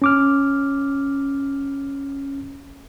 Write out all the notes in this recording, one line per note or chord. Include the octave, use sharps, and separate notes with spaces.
C#4 D6 F6